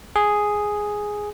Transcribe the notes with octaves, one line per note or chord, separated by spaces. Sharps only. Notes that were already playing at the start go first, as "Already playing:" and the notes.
G#4